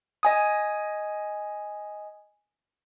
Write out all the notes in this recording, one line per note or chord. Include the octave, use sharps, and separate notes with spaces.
D#5 G#5 D#6